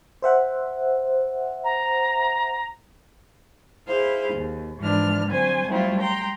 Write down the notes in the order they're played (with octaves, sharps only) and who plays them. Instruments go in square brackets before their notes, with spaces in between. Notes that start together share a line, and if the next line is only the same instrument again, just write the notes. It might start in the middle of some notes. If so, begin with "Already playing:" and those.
[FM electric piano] C5 E5 F#5
[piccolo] A#5
[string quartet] E4 G#4 C5 F5
D#2
G#2 E3 F3 D4 F6
D3 F#3 C4 C5 G#5
F#3 G3 A3 C4 E4 F4
G5 A#5 C6